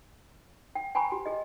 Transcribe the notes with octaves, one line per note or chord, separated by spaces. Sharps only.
G5
G5 G#5 A#5 B5 C#6
G4
G#4 D#5